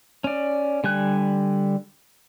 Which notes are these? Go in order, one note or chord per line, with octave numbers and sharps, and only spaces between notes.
C#4 D5
D3 G3 G#5 F#6